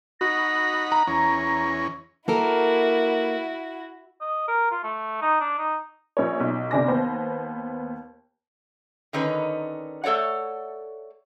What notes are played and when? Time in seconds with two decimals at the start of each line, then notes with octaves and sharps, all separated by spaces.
0.21 D#4 F#4 F#5 B5 A#6
0.92 A#5
1.07 E2 C#4 A#6
2.28 A#3 E4 F#4 A4 A#4
4.21 D#5
4.48 A#4
4.71 F4
4.83 A3
5.21 D#4
5.41 D4
5.58 D#4
6.17 A#1 C#5
6.40 B1
6.71 G1 C3 D4 G#5 D6 A#6
6.88 D#2 B3 C5
9.13 D3 D#3 C#4 D#4 B4
10.04 A3 A4 C#5 D5 F#5